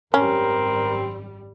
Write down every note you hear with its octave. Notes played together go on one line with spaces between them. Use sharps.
G#1 F#2 G3 C4 C#4 A#4